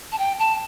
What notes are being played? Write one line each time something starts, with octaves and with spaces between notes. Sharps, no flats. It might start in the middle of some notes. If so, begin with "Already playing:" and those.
A5
G5
A5